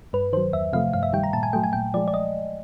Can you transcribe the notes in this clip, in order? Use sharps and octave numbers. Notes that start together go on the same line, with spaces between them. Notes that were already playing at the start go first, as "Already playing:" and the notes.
G2 B4
D#3 F#3 C5
E2 E5
C3 F3 A3 F5
G2 F5
E5
D#3 G3 G5
A#5
A#2 A5
G#5
F#3 A3 G5
G#5
A#2 G5
F3 G#3 D5
D5
D#5